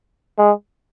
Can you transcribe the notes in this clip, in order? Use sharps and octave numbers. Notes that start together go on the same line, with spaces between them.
G#3